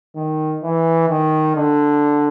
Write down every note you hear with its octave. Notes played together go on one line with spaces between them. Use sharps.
D#3
E3
D#3
D3